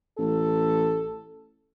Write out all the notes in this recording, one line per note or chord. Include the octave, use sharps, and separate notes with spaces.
A1 A4